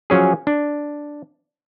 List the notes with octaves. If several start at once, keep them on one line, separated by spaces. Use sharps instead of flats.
F3 F#3 C#4 G#4
D4